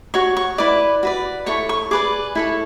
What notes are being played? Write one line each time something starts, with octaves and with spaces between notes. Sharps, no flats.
F#4 C#5 C#6
C#6
E4 B4 D5 D6
F#4 B4 D5
E4 A4 C#5 C#6
C#6
G#4 B4 D5 D6
E4 A4 C#5